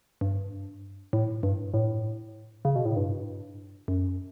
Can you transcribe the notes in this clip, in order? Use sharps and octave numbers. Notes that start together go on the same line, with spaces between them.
G2
A2
G2
A2
C#3
B2
A2
G2
F#2